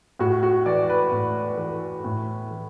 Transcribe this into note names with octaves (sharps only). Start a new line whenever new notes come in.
A2 F#4
F#4
E3 D5
B4
A2
E3
A2
E3